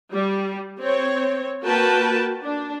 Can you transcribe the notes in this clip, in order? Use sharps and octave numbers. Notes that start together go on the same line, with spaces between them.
G3
C4 C#5
A#3 F#4 A#4 B4 G5 A5
D4